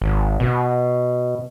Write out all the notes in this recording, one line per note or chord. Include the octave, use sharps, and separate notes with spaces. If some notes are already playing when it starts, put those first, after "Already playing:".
G#1
B2